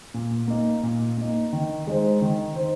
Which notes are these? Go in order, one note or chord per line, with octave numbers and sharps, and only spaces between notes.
A#2
A#3 D#4
A#2
A#3 D#4
D#3
G#3 D#4 C5
D#3
D#4 C5